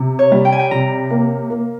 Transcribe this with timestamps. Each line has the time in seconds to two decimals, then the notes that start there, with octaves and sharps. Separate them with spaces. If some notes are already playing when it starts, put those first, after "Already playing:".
Already playing: C3
0.19 C#5
0.32 G3
0.45 G5
0.52 G#5
0.59 G5
0.71 C3 A#5
1.11 A#3
1.50 A#3